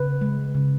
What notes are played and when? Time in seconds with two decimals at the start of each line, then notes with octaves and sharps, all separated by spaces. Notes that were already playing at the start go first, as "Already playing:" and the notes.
Already playing: C#3 B4
0.21 G#3
0.55 C#3